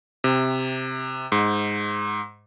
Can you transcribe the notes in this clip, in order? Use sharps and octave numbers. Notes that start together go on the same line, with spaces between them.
C3
G#2